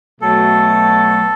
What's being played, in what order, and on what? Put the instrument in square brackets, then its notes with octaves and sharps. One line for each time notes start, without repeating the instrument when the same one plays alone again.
[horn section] B2 F#3 A3 [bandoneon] A4